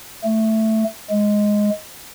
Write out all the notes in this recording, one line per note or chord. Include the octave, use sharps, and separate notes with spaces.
A3
G#3